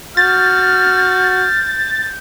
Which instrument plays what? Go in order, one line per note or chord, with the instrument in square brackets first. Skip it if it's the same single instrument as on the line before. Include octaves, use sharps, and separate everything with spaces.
[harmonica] F#4 [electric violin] F6 [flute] G6 [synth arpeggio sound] A6